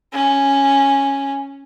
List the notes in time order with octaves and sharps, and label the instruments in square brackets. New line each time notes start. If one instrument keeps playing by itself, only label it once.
[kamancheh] C#4